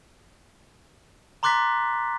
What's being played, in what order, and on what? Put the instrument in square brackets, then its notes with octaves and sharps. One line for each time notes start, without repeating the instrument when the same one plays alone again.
[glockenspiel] A#5 C6 D6 F#6 A6 B6